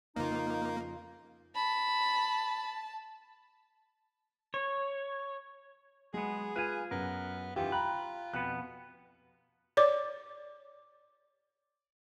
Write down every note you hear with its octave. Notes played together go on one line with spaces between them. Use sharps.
F2 C#3 A#3 D#4 F4
A5 B5
C#5
F#3 G#3 B3 G#4
F4 B4 F5 G#5 D#7
F#2 B3 A#4
F#2 D#3 E3 F4 G4
G5 A#5 B5 F#6
F2 B2 B3 F#6
C#5 D5 D6